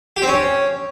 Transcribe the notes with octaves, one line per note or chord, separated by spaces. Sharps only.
G4
C4
C#4